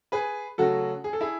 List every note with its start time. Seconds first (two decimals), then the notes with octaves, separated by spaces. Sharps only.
0.12 G#4 B4
0.58 C#3 F#3 A3 F#4 A4
1.04 G#4
1.13 A4
1.21 E4 G#4